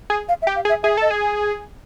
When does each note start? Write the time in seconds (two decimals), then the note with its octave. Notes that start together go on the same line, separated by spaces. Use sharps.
0.10 G#4
0.29 F5
0.42 E5
0.47 G4
0.56 F5
0.65 G#4
0.69 E5
0.83 G#4 E5
0.97 A4 D#5
1.11 G#4